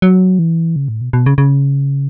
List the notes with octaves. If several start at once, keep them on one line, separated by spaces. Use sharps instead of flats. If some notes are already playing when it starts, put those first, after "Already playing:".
F#3
E3
C#3
A2
B2
B2
C#3
C#3